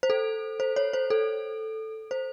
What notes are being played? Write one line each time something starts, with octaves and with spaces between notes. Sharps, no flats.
C5
A4
C5
C#5
C5
A4
C5